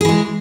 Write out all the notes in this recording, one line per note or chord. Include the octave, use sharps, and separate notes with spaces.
E3 G#3 G#4